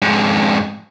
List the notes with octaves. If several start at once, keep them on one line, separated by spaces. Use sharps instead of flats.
F2 G#2